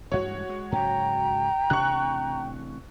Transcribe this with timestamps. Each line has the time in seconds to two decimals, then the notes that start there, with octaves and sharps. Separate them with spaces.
0.12 A1 G2 G#3 F#4 C#5
0.49 G#3
0.72 G#2 C#3 F#3 G5 A#5
1.70 A1 C3 D4 C#6 F#6